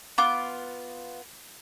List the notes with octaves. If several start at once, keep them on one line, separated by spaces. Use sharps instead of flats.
B3 F4 D6